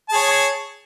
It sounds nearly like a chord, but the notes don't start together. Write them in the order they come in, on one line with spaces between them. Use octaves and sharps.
A5 G#4 C#5